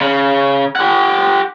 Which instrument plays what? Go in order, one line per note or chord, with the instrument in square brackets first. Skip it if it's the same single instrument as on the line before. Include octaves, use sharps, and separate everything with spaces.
[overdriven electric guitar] C#3
G4 F#5